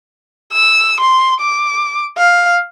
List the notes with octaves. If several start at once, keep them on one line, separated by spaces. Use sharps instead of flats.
E6
C6
D6
F5